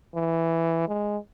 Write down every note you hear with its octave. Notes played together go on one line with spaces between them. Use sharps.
E3
G#3